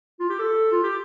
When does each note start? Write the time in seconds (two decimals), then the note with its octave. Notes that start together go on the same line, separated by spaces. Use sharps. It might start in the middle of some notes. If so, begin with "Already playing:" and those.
0.20 F4
0.30 G4
0.39 A4
0.72 F4
0.84 G4